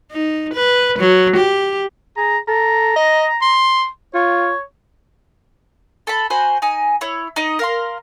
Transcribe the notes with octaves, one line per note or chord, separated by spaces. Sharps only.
D#4
B4
F#3
G4
G#4 A#5
A4 A#5
D#5
C6
F4 C#5
A4 A5 B5
F#4 C5 G#5 B5
D#4 G#5
E4 C#5
D#4 D#5
A#4 F5 C6